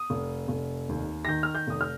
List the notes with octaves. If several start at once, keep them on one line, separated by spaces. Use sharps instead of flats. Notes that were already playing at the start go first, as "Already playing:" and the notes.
Already playing: D#6
F1
F1
D#2
A#6
D#3 G6
F6
G6
F1 D#6
F6